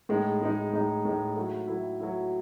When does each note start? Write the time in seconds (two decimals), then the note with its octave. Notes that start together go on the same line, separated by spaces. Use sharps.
0.09 A2 G#3 D#4
0.41 A2 G#3 D#4
0.73 A2 G#3 D#4
1.05 A2 G#3 D#4
1.36 F#3 A3 E4
1.68 F#3 A3 E4
2.00 F#3 A3 E4